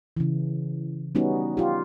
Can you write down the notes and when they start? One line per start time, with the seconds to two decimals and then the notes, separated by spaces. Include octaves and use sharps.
0.17 C#3 E3
1.15 G3 B3 C#4 D#4 F#4
1.57 F4 G4